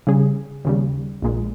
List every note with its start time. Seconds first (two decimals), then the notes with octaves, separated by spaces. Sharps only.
0.07 C#3 G3 C#4 G#4
0.65 D#2 C#3 G3
1.22 A#1 A#2 G#3